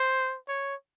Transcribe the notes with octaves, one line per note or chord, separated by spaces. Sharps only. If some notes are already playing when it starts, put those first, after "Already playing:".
Already playing: C5
C#5